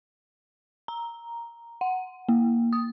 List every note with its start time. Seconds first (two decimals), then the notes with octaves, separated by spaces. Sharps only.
0.88 A#5
1.81 F#5
2.29 A#3
2.73 D#6